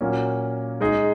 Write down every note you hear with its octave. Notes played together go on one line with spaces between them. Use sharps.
A#2 F#3 A#3 C#4
G#3 D#4 G#4 D#5